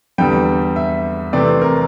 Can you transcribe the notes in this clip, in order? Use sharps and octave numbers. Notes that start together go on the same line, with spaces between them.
E2 D3 G3 G5
E5
C3 E3 A3 C4 D5
A#4